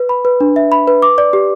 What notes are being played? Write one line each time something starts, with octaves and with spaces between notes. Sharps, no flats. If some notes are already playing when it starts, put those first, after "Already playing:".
Already playing: B4
B5
B4
D4
E5
B5
B4
D6
D5
G4